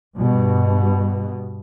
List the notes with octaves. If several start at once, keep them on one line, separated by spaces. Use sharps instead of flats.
G2 B2